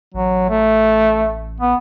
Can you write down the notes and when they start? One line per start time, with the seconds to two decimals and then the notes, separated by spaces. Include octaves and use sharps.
0.14 A1 F#3
0.49 A3
1.60 B3